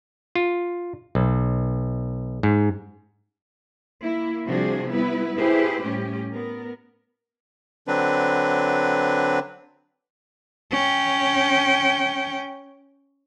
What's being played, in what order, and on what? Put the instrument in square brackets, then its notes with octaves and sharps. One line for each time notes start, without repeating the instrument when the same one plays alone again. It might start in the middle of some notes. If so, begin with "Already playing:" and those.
[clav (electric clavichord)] F4
B1
G#2
[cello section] A#3 E4
C3 F3 G3 D4 F#4 G#4
G3 B3 E4 B4
E4 G4 G#4 B4 C5
A2 G3 C#4 G4
B3 A#4
[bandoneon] D3 F#3 C4 D4 B4
[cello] C#4 G5